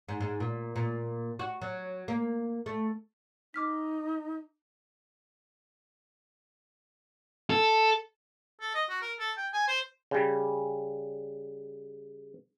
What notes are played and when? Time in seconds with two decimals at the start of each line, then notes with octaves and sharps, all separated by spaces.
0.08 G#2
0.20 G#2
0.40 A#2
0.76 A#2
1.39 F#4
1.62 F#3
2.08 A#3
2.66 A3
3.54 D#4 D6 F6 B6
7.50 A4
8.61 A4
8.74 D#5
8.89 F#4
9.02 A#4
9.19 A4
9.37 G5
9.53 G#5
9.68 C5
10.11 C#3 G3